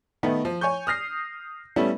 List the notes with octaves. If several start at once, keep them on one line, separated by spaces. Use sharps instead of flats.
D#3 A3 B3 D#4
F3
C#5 G#5 C#6 G6
D#6 F6 A#6 C7
G3 A3 B3 C#4 E4